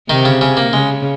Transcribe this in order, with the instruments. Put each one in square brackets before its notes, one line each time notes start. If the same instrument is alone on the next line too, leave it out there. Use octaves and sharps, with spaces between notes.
[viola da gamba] C3 [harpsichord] D#3 D#4
[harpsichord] C#3 C#4
C#3 C#4
A#3
[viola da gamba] C#3 [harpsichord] G#3